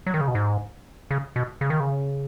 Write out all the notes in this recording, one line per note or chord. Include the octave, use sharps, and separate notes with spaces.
F#3
D#3
C#3
B2
G#2
C#3
B2
C#3
D#3
C#3